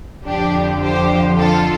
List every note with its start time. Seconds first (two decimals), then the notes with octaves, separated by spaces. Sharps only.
0.25 F2 D3 F3 D4 G4
0.81 G4 C5
1.36 F4 A4